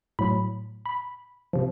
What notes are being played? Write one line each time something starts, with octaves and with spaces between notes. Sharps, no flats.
A2 F#3 B5
B5
C3 F3